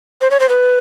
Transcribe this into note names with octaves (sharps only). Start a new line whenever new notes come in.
C5
C#5
C5
B4